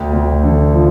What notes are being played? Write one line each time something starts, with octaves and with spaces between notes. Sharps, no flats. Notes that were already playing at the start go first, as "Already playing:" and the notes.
Already playing: D2 G5
D2
D3
F3